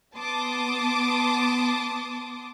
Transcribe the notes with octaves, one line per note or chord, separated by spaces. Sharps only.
B3 A5 C6 D6 D#6